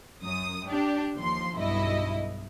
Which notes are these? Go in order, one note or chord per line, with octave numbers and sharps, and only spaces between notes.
F#2 D#6
D4 G4
D#2 F3 C6
B1 G2 E4 D#5